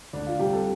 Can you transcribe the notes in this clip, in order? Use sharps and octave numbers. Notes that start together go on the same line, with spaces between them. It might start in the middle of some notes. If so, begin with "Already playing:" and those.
D2 D4
F4
C3 G3 G4
A4